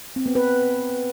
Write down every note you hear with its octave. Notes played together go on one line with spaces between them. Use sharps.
C4
B3
B4